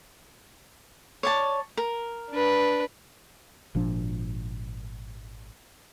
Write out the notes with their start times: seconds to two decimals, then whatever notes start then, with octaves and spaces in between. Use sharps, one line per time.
1.23 C#5 D5 A5
1.77 A#4
2.30 D4 B4
3.75 G#1 A#2 F3 D4